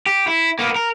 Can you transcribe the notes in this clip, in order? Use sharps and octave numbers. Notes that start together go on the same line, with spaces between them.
G4
E4
A#3 B3
A#4